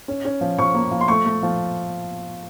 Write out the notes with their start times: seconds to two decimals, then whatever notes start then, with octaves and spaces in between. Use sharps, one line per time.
0.08 C#4
0.25 C#4
0.41 F3
0.58 F3 C#6
0.75 A#3
0.91 F3
1.01 C6
1.08 A3 C#6
1.25 A3
1.43 F3